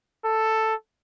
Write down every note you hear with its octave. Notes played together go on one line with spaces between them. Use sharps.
A4